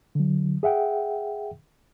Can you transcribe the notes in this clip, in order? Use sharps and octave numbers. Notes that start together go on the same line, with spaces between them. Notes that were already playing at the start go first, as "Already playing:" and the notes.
D3 F#3
G#4 E5 F#5 G5